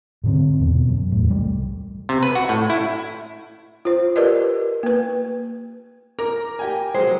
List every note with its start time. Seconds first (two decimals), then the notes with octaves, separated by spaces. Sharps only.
0.24 G#2 D3 C4
0.59 E2 B2
0.89 F#2
1.12 E2 A2
1.29 C2 G3 A3
2.09 C3
2.23 B4
2.35 F#4
2.49 A2
2.70 E4
3.85 F4 C5
4.16 G4 A#4 B4 D5 D#5
4.83 A#3 B4
6.19 A#4 D6
6.59 G4 G5 G#5
6.95 F#3 G#3 C5